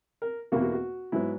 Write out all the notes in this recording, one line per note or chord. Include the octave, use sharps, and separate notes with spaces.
A#4
E2 B2 A#3 F#4
F#4
F#4
G#2 F#3 B3 E4